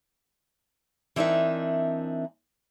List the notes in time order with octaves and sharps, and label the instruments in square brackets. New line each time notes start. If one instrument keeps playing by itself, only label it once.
[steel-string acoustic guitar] E3 C4 D4 D#4 A#4 E5